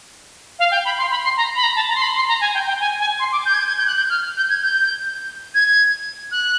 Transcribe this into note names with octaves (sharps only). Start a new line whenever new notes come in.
F5
G5
B5
C6
B5
C6
A#5
B5
A#5
A5
A#5
C6
B5
C6
A#5
G#5
G5
G5
G#5
G#5
C6
D6
G6
G#6
G6
G#6
G6
F#6
G6
F6
G6
G#6
G6
G#6
F#6